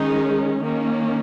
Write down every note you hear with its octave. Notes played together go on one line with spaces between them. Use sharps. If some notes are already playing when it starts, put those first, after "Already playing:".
Already playing: D#3 G#3 C#4 D#4 G#4
D#3 A#3 C#4